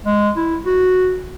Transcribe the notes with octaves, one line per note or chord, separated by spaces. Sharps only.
G#3
E4
F#4